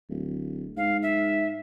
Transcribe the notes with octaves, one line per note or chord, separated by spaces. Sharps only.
D1
G#2 F5
E5